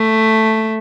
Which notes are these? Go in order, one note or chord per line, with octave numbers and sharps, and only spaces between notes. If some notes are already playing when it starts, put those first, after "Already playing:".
Already playing: A3